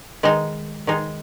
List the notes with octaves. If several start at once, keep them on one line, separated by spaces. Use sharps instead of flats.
D#3 G#3 D#4
D#3 G#3 D#4